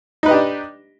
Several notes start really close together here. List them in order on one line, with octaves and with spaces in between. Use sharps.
D#4 B4 D#5 G4 D4